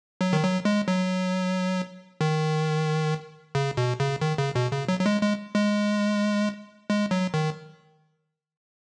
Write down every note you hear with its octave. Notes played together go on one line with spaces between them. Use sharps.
F#3
D#3
F#3
G#3
F#3
D#3
C#3
B2
C#3
D#3
C#3
B2
C#3
F#3
F#3
G#3
G#3
G#3
G#3
F#3
D#3